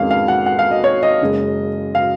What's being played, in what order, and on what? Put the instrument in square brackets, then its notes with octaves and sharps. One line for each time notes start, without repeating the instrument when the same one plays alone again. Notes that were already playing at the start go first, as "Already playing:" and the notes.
Already playing: [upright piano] F2 D#3 G#3 C#4 F5
F5
F#5
F#5
F5
D#5
C#5
D#5
F#1 F#2 C#3 G#3
F5